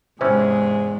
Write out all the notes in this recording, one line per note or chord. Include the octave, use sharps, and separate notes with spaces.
E2 G#2 C3 E3 C#4 G#4 C5